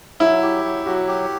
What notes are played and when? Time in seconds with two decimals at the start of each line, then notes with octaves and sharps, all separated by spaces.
0.20 F#3 E4
0.42 G4
0.64 F#3
0.86 F#3 F#4
1.07 G4